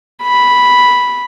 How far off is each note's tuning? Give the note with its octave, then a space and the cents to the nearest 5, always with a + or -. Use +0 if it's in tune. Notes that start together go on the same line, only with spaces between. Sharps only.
B5 -5